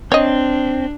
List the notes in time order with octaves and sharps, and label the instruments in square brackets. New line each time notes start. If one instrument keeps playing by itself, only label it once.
[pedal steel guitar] C4 [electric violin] D4 [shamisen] C#5 D#5